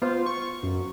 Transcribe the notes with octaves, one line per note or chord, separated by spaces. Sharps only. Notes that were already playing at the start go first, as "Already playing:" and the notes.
B3 F4 C5
C#6
F#2